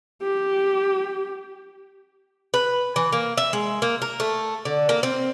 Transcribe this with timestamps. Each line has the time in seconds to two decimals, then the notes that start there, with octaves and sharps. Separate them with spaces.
0.23 G4
2.54 B4
2.96 E3
3.12 A#3
3.37 E5
3.53 G#3
3.82 A#3
4.02 A#4
4.20 A3
4.65 D3
4.89 A#3
5.03 C4